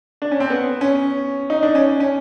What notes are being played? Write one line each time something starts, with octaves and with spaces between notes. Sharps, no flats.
D4
C#4
C4
B3
C#4
D#4
D4
C#4
C#4